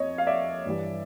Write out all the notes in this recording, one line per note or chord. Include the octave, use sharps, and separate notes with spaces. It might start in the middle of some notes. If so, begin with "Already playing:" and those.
Already playing: F2 C#5 D#5
F5
D5 E5
G2 E3 G3